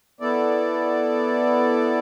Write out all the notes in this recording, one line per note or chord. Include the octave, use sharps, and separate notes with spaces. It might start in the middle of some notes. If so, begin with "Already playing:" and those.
B3 E4 A4 D5